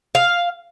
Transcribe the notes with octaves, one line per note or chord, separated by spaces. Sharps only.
F5